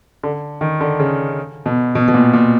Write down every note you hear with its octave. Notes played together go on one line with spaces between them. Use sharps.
D3
D#3
D3
C#3
B2
B2
B2
A#2
A#2